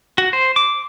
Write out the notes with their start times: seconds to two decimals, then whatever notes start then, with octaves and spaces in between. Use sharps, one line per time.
0.18 F#4
0.33 C5
0.56 D6